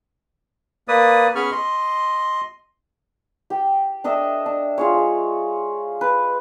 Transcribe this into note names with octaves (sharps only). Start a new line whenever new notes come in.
A#3 B4 D5 D#6
B3 C#4 G#4 B5 C#6 F6
D#5 C6
G4 G5
D4 A4 D#5 E5
D4
F4 G#4 C#5
G#3
B4